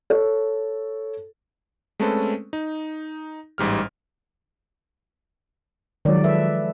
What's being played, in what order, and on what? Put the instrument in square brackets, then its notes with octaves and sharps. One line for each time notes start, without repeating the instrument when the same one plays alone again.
[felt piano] A4 C#5
[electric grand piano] G#3 A3 C4 C#4 A4 B4
D#4
A1 G#2 G3 F6
[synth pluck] D#3 F#3 [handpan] F3 G#3 D5
[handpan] A4 B4 E5